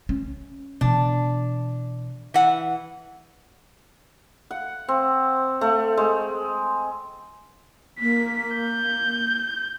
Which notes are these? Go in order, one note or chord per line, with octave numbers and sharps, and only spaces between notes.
C#4
B2 E3 D4
E3 F#5
F#5
C4
A3
G#3
A#3 B6
G6